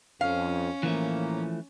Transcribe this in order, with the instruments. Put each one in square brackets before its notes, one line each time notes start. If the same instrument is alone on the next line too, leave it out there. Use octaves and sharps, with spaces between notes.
[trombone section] F2 [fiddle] C#4 [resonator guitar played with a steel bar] F5
[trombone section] A2 A#3 [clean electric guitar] E3 F3 A3